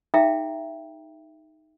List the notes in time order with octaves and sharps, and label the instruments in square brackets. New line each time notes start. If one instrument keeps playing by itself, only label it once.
[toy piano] D#4 G#4 E5 F5 G5 A#5